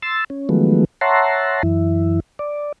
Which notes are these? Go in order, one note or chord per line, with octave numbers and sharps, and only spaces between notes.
C6 E6 A6
C#4
D#3 F3 F#3 G#3 A3 B3
C#5 E5 F#5 A5 A#5 C6
F#2 E3 E4
D5